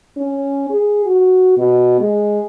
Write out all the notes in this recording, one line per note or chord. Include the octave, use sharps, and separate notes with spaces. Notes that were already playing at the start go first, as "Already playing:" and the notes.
C#4
G#4
F#4
B2
G#3